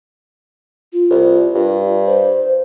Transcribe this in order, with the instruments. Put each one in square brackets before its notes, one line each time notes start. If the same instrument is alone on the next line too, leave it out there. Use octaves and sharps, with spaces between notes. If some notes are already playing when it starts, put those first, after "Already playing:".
[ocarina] F4
[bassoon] C2
G2
[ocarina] C5